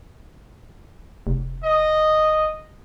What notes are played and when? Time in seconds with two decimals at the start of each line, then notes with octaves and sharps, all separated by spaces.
1.27 F1
1.64 D#5